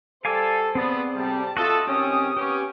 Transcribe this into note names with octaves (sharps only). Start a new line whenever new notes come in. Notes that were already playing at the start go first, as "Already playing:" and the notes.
G3 A4 C5 F5 G#5 D6
B3 C4 G#4 C5 D5 F#5
A2 C3 G3 A5
F4 F#4 A4 D#5 E5
D#3 G#3 C4 C#4 G4 D#6
B3 C#4 G4